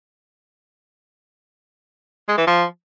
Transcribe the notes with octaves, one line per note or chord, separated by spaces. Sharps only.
G#3
E3
F3